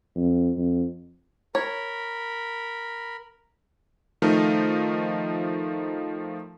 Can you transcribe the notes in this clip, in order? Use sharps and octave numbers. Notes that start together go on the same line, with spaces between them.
F2
F2
A#4 C#5 B5
D#3 F3 A3 D#4 A#4